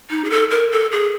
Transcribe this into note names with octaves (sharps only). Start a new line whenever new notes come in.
D#4
G#4
A4
A#4
A4
G#4